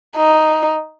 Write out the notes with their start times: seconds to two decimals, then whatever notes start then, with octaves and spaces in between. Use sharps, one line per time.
0.16 D#4